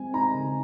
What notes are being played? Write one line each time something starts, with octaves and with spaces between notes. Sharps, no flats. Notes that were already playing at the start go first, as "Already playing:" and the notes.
Already playing: G#3 C4 G#5
D#4 A#5
C#3